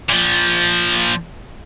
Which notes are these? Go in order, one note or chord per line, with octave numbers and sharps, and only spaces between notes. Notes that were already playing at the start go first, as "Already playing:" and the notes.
A#2 F3